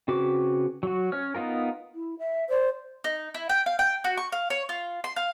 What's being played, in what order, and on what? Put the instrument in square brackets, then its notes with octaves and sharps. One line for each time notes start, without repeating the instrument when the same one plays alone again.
[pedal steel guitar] C#3 C4 F#4 B4 D6
F#3 F#4
C#4 C#5 F6
B3 D#4 F4 A#4
[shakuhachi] E4
E5
[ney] C5 [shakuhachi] D5
[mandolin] D#4
E4
G5
F5
G5
F#4
C#6
F5
C#5
F4
C6
F5